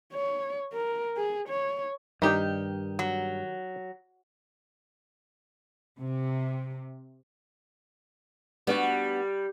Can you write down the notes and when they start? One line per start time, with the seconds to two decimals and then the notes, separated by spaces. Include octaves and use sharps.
0.13 C#5
0.73 A#4
1.17 G#4
1.48 C#5
2.22 G2 D#3 D#4 G4 D5
2.99 F#3
5.99 C3
8.67 G3 B3 D4 F#4